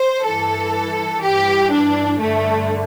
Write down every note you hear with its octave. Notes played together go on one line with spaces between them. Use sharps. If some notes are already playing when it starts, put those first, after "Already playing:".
Already playing: C5
G2 E3 A4
G2 E3 G4
D4
G2 D3 A3